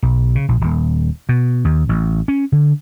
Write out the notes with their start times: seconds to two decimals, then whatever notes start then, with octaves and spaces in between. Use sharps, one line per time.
0.02 B1
0.35 C#3
0.48 A#1
0.61 D#1
1.29 B2
1.65 D#2
1.89 A1
2.28 C#4
2.52 D3